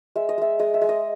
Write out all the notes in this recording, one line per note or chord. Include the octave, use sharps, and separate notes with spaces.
G#3 E5
D#5
G#3 E5
G#3 D#5
E5
G#3
D#5